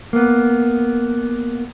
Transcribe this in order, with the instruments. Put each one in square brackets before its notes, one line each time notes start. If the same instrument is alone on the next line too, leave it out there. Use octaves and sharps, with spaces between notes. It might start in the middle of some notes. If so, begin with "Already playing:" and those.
[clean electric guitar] A#3 B3